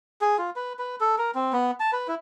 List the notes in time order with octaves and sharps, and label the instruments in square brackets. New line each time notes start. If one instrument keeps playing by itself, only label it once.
[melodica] G#4
F4
B4
B4
A4
A#4
C4
B3
A5
B4
E4